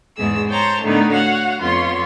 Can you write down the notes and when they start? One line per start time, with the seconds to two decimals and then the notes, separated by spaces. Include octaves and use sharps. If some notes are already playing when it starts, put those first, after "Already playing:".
0.16 E2 G#2 B2 G#4 E6
0.49 C5 C#5 G5 A5 A#5
0.82 A2 D3 D#3 A3 B3 D#4
1.12 F#4 C#5 F5 F#5
1.60 F2 B3 F4 C#5 C6